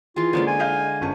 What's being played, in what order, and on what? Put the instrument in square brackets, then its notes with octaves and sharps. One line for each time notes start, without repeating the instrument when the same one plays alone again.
[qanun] E3 G#4 [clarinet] F4
[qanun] D3 G#3 D5 [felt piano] A#3 C#4 C5
[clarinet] G#5
[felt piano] D#5 F5 G6
G1 C#4 A5